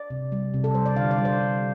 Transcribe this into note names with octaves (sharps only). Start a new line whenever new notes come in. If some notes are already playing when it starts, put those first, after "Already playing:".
Already playing: D5
C3
G3
C3
A4
G3 C5
D5
D3 F5
D5
G3
C5
D3